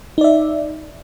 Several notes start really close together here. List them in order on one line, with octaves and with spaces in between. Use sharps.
D#4 D5 E5